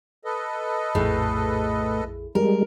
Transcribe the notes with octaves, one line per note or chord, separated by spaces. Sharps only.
A4 B4 D#5
A#1 F2 A2 G#4
F2 G3 G#3 A#4